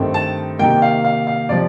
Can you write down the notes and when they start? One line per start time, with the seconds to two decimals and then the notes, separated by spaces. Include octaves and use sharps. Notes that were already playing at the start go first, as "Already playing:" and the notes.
Already playing: G2 D#3 A3 C4
0.14 A5
0.59 C3 D#3 A#3 G5
0.82 F5
1.05 F5
1.27 F5
1.49 C3 F3 D5